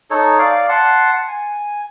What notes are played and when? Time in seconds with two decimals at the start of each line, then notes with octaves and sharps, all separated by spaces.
0.11 D#4 A4 C#5
0.39 D5 F5
0.69 F#5 A5 C6
1.28 G#5